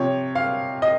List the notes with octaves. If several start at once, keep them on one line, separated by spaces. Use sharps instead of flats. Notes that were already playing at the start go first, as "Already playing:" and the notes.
Already playing: C3 F3 C#5
F5
D#5